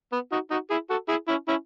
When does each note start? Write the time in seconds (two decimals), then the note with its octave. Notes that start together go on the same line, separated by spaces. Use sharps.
0.12 B3
0.32 D#4 F#4
0.50 D#4 F#4
0.70 E4 G#4
0.90 F#4 A4
1.08 E4 G#4
1.28 C#4 E4
1.48 C#4 E4